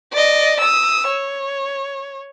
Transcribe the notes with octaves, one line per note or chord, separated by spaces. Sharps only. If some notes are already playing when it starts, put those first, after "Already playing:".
D5 D#5
D#6 E6
C#5